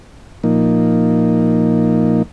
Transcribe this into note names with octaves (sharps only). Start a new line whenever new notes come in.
A#2 F3 A#3 D#4